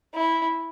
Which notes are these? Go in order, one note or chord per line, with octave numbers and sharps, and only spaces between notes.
E4